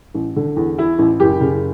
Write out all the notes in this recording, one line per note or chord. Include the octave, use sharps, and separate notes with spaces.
A1
D3
E2
E3 E4
A1
F#1 G4
C#3